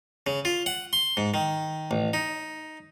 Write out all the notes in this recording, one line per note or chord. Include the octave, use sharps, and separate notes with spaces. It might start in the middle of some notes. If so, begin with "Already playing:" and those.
C#3
F4
F#5
C6
G#2
D#3
A1
D#4